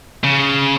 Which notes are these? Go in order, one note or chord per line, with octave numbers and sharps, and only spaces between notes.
C#3